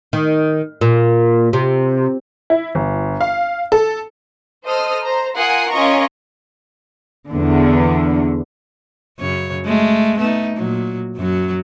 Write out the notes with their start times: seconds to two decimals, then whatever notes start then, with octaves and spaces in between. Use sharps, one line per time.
0.13 D#3
0.81 A#2
1.53 C3
2.50 E4
2.75 G1
3.21 F5
3.72 A4
4.65 A4 C5 D#5 D#6 F6
5.04 C5 A#5
5.36 F4 A#4 F#5 G#5 D#6 C7
5.70 C#4 F4 A#4 D#5 A#5 C#6
7.30 E2 D3
9.19 F#2 C#3 C#5
9.66 G#3 A3
10.18 A3 B3 D#4
10.57 A#2 F#3
11.17 F#2 F#3